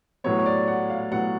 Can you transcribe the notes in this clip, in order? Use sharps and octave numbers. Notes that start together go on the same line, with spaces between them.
A2 F#3 B3 C#5
C#5
D5
F#5
F5
A2 F#3 B3 F#5